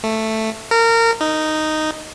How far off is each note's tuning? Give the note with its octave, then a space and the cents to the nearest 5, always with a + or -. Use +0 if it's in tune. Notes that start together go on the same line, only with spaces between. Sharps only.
A3 +5
A#4 -25
D#4 -5